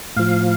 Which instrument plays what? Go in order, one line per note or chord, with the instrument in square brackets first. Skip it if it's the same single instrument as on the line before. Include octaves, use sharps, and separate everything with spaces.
[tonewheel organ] A2 F3 F5